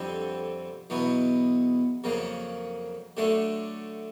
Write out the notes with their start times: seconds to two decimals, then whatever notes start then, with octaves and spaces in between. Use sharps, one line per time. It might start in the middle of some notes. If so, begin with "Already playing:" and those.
Already playing: F2 D3 G3 C4
0.90 E2 B2 F#3 B3
2.04 F2 C#3 F#3 A#3
3.17 D3 F#3 A3 D4